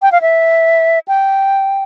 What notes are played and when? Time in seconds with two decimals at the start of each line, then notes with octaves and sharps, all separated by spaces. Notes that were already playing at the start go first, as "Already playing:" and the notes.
0.02 G5
0.12 F5
0.22 E5
1.08 G5